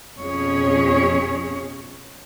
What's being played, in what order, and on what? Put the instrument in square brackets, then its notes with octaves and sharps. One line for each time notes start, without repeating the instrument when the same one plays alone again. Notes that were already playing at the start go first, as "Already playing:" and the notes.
[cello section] F2 B2 F3 C#4 G#4 C#5